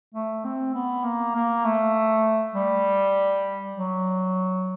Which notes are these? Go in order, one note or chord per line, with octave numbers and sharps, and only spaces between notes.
A3
C4
B3
A#3
A#3
A3
G3
F#3